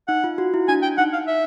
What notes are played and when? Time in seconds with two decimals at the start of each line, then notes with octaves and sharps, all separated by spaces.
0.08 D#4 F#5
0.24 F4
0.38 F#4
0.54 E4
0.68 D4 G#5
0.82 G5
0.98 D#4 F#5
1.13 F5
1.27 E5